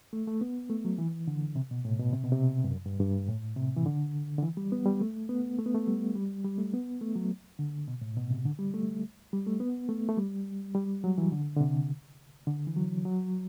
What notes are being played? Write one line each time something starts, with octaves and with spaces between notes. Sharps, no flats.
A3
A3
B3
A3
F#3
E3
D3
C3
B2
A2
B2
C3
B2
C3
G2
F#2
G2
G2
A2
C3
E3
D3
D3
E3
G3
B3
G3
A3
B3
A3
B3
A3
G3
G3
G3
A3
B3
A3
F#3
D3
B2
A2
B2
C3
D3
G3
A3
G3
A3
B3
A3
A3
G3
G3
F#3
E3
D3
D3
C3
D3
E3
F#3
F#3